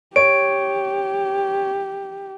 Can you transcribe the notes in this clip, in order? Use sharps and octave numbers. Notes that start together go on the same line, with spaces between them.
G4 C#5 D7